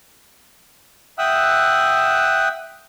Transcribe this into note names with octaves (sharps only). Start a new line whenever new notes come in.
E5 F#5 G5 D#6 E6 F#6